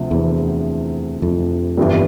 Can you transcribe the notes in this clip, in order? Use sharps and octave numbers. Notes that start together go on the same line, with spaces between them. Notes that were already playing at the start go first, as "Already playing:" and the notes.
Already playing: D2 C3 F3
E2
F2
G1 G2 E3 G3